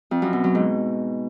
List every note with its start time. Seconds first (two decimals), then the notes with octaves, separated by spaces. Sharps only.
0.11 F2
0.22 F#2
0.33 B2
0.44 F#3
0.55 G#2